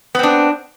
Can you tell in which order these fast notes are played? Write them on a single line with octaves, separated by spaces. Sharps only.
B3 C4 D4